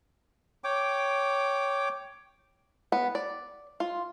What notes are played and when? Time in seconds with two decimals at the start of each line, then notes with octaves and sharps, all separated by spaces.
0.64 C#5 G5 D6
2.92 B3
3.15 D5
3.80 F4